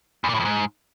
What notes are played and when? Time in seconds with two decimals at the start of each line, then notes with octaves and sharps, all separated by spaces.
0.24 E2
0.29 A#2
0.34 A2
0.40 F2
0.45 G#2